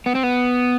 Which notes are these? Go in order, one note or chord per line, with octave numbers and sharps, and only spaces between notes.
B3
C4
B3